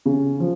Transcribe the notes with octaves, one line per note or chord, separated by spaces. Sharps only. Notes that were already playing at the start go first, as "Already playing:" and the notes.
C#3
F3